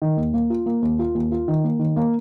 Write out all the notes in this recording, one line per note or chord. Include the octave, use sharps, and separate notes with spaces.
D#3
D#2
A#3
F4
A#3
D#2
F4
D#2
F4
D#3
A#3
D#3
A#3